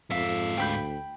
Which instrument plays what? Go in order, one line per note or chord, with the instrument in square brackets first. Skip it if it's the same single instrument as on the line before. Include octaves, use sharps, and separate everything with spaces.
[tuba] F2 [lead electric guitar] G#2 F5 [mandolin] E5
[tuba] D2 [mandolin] G5 B5 G6